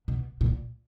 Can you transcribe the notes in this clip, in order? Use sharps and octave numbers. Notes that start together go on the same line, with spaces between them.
B2
A#2